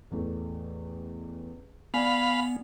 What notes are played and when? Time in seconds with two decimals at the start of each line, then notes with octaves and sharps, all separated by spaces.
0.11 A1 E2 A3
1.94 B3 D5 F5 G#5 B5